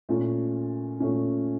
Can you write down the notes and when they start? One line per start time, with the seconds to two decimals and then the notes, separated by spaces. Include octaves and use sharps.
0.09 A#2 A3 C#4
1.00 A#2 A3 C#4